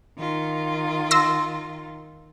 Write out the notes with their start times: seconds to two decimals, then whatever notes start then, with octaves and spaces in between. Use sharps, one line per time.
0.19 D#3 F4
1.11 C6 E6 A#6